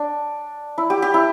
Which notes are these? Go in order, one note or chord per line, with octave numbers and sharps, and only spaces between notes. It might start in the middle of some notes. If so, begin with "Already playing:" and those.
Already playing: D4
E4
G4
G4
E4